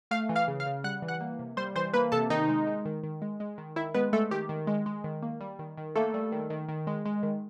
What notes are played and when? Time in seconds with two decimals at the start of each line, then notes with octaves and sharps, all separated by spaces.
0.11 A3 F5 F6
0.29 E3
0.36 F5 F6
0.48 C#3
0.60 F5 F6
0.66 C#3
0.84 G3 F#5 F#6
1.02 E3
1.08 F#5 F#6
1.21 A#3
1.39 C3
1.57 G3 C5 C6
1.76 E3 C5 C6
1.94 A#3 B4 B5
2.12 C3 A4 A5
2.30 D#3 D#4 D#5
2.49 G#3
2.67 G#3
2.86 D#3
3.03 D#3
3.22 G#3
3.40 G#3
3.58 D#3
3.76 D#3 E4 E5
3.94 G#3 B3 B4
4.13 G#3 A3 A4
4.31 D#3 G4
4.49 D#3
4.67 G#3
4.86 G#3
5.04 D#3
5.22 A#3
5.41 G3
5.59 D#3
5.78 D#3
5.96 A3 A#3 A4
6.14 G3
6.32 D#3
6.50 D#3
6.69 D#3
6.87 G#3
7.05 G#3
7.23 D#3